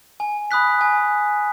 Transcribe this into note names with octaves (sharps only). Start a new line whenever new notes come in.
G#5
B5 D#6 F#6 B6
G#5